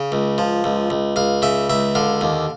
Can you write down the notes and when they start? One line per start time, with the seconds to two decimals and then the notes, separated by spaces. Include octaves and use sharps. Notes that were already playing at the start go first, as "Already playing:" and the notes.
Already playing: C#3
0.12 C#2
0.38 F3
0.64 C#2
0.90 C#2
1.16 C#2 F5
1.42 C#3 E5
1.69 C#2 E5
1.95 D3 F5
2.21 D#2